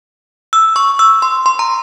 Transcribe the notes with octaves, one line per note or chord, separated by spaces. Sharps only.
E6
C#6
E6
C6
C6
A#5